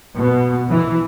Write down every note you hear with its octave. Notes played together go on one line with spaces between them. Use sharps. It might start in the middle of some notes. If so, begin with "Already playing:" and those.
B2
E3